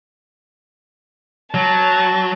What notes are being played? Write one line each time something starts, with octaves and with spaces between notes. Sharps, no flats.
F#3 A5